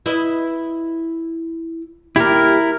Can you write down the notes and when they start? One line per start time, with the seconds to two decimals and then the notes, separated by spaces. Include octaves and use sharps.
0.06 E4 B4 D#5
2.16 D#2 G3 E4 G4 A#4